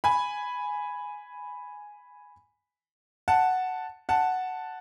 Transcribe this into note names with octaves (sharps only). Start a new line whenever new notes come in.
G#5 B5
F#5 A5
F#5 A5